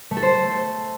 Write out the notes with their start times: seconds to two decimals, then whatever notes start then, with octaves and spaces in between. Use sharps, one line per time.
0.11 A3
0.17 A4
0.23 C5